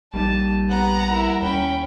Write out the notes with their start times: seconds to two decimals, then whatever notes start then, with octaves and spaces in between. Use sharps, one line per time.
0.14 A#1 G3 A#3 D#4 A5
0.69 B3 G4 F#5 A#5
1.08 E4 A#4
1.42 D#2 C#4 G5 B5